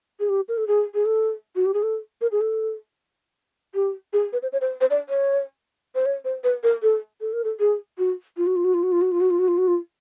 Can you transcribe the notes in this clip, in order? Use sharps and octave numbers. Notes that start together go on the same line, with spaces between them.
G#4
G4
A#4
A4
G#4
G#4
A4
F#4
G4
G#4
A4
A#4
G#4
A4
G4
G#4
B4
C5
C#5
C5
C5
D5
C#5
C5
C#5
C5
B4
A#4
A4
A4
A#4
A4
G#4
F#4
F4
F#4
F4
F#4
F4
F#4
F4
F#4
F4
F#4
F4
F#4
F4
F#4
F4